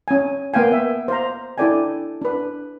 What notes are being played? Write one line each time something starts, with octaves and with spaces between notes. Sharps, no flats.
C#4 G#5
A#3 B3 F5 G5 G#5
E5
C5 F5 A#5
D4 E4 A4 D5 G5 G#5
D4 B4